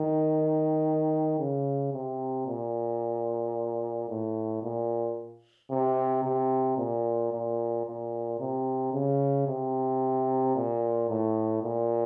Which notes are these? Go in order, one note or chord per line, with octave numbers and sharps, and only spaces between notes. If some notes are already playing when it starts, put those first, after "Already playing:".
Already playing: D#3
C#3
C3
A#2
A2
A#2
C3
C3
A#2
A#2
A#2
C3
C#3
C3
A#2
A2
A#2